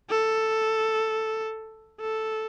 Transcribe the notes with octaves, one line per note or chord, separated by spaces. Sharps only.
A4
A4